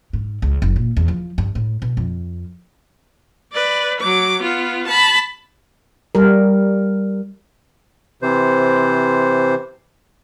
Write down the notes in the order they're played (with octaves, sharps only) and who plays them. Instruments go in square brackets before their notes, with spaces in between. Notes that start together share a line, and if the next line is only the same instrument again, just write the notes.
[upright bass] G#2
C#2
F#1
A#2
E2
F3
G2
A2
B2
F2
[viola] B4 D5
F#3 D6
B3 F4
A5 B5
[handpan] G3 A#4
[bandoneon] C3 E3 C5